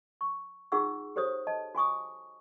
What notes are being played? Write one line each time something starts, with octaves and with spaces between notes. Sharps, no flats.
C#6
D#4 F4 G#4 F#5 C#6 E6
G4 A4 C5 C#5 D#6
D#5 A5
F#4 G#5 C#6 D#6